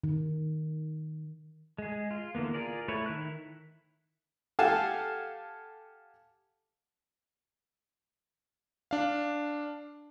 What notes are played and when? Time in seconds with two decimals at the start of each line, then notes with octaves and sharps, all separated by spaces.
0.04 D#3
1.78 G#3 G#4
2.11 F4
2.35 D3 E3 A#3 B3
2.54 F4 G#4 A#4 D5
2.88 A3 E4 B4 C#5
3.06 D#3 E4 F#6
4.59 G4 A4 F5 F#5 G#5 A5
8.91 D4 F5